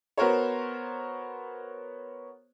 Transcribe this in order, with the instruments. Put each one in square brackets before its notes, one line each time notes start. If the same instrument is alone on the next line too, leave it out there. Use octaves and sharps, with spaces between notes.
[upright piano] B3 F#4 A#4 C5 C#5